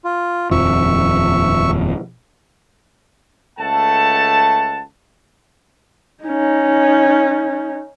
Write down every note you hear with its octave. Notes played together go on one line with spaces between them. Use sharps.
F4
D#1 F2 F3 E5 C#6
C#2 A3 A4 F#5 A5
C#4 D#4